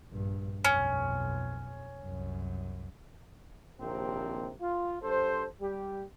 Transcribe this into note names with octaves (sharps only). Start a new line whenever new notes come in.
A#1 G2
B1 F2 C#4
C2 F#2
A#1 D#2 C3 C4 A#4
F4
G2 A4 C5
G3 G4